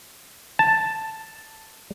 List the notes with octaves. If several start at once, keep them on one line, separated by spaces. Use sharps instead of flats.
A5